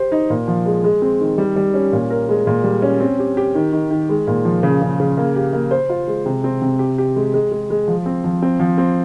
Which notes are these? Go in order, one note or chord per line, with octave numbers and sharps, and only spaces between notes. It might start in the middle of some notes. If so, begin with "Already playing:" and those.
Already playing: G4 C5
D#4
A#2
F3
G#3
G#3
C4
D#3
G3
G3
C#4
A#2
A#4
G#3
A#2
G3
C#4
C4
G4
G4
D#3
D#3
D#3
G#3
A#2
F3
C#3
C#3
C#3
A#3
G4
A#3
C5
F4
G#3
C3
C4
C3
G4
G4
G#3
G#3
G#3
G#3
F3
C4
F3
C4
F3
C4